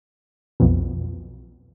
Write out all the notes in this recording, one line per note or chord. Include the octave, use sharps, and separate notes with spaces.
B1 F2 B2